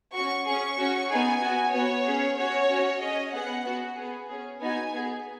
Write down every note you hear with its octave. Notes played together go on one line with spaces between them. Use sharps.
C#4 F#4 C#6
C#4 G#4 C#6
C#4 F#4
B3 D#4 G#4 G#5
B3 F#4
B3 F#4 C#5
C#4 G#4
C#4 F#4 C#5
C#4 F#4
C#4 G#4 D#5
B3 G#4 F#5
B3 F#4
B3 G#4
C#4 G#4
B3 D#4 F#4 G#5
B3 G#4